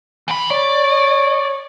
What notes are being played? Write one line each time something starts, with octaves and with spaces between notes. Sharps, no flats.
E3 B5
C#5 D5